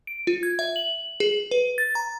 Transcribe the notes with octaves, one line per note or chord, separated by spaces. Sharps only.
D7
F4
G#6
E5
F#7
G#4
B4
A6
A#5